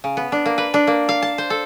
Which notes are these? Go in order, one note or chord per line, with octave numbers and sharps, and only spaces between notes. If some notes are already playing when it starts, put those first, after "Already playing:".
C#3
B3
D4
A#3
B4
D4
A#3
F5
A5
C5
A4